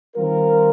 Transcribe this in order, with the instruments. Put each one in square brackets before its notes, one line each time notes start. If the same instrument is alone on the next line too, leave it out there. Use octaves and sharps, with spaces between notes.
[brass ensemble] D#3 G3 C4 F4 A#4